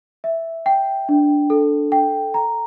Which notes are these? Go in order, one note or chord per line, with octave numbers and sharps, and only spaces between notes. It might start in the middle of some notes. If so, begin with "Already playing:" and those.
E5
G5
D4
A4
G5
A#5